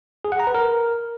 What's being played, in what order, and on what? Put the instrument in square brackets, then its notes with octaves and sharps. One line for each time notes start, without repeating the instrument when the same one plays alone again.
[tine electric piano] G#4
F#5
A#5
B4
A#4